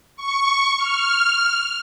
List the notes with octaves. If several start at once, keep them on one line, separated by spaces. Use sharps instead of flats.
C#6
F6